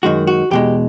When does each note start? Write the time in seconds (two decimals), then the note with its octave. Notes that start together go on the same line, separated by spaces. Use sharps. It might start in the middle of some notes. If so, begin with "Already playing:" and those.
0.03 F#2 D#3 G#3 F#4
0.27 F#4
0.51 E2 B2 G#3 G4